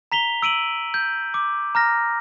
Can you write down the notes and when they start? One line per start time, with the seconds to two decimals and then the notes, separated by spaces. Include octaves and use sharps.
0.12 A#5 B6 F7 G7
0.42 E6 D7 D#7 F#7
0.94 G6
1.34 D6
1.75 A#5 F6 A#6